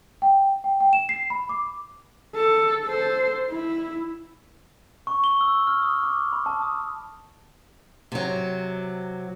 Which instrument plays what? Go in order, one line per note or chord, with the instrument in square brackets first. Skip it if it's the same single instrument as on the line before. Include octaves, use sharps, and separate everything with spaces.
[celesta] G5
G5
G5
E7
C7
B5
D6
[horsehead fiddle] A4
A4 C5
E4
[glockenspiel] C#6
G7
E6
F6
D#6
D6
B5
A5
D#6
[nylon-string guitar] C3 F#3